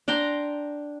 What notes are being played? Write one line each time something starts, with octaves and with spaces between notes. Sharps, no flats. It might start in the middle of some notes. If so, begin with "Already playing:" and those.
D4 G5 A#5 C6